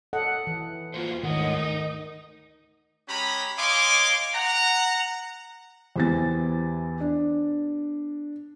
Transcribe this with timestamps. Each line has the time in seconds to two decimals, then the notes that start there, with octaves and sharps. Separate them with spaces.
0.13 A4 D#5 F#5
0.47 E3
0.94 A#3 F4 F#4 C5
1.23 D2 G#2 D#3 C#5 D#5 F#5
1.55 D#4
3.09 G#3 C#4 G4 A#5 B5
3.57 C#5 D#5 F5 G#5 C6 D6
4.34 F#5 A#5
5.96 E2 E3 B3 G4 C5 A6
7.01 D4